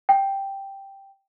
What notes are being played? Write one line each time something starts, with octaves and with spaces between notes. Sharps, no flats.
G5